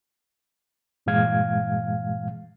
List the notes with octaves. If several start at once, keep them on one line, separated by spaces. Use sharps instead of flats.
G2 A#2 E3 G#3 F5 G#6